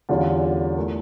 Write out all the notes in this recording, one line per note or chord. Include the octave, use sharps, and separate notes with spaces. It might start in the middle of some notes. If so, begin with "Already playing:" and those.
E2 D3 G3 C#4 F4
A3 E4 A#4